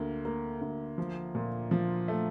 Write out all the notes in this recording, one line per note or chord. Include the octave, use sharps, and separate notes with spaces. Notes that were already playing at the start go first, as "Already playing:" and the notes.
Already playing: D2 A#3
A#3
D2
F3
A#2
F3
A3